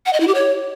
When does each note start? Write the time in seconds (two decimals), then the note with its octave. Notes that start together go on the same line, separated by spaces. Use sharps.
0.06 F#5
0.13 D#5
0.20 E4
0.27 G4
0.35 C#5